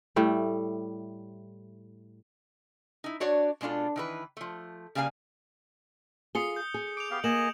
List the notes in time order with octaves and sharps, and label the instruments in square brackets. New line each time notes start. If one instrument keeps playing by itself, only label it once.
[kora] A2 G3 A3
[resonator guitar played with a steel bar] D#4 E4
D4 F#4 C#5 D5
B2 G#3 D4 F4 A4
D#3 E3 B4
F3 A3
C#3 G3 A#3 F5 G#5
[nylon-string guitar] F4 G#4 [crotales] D#6 C#7 G7
[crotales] G6
[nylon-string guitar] G#4
[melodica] D6 [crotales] D7 F7
[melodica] B3 G4 F5
[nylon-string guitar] A#3 [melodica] G#4 D#5 [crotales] E7 F#7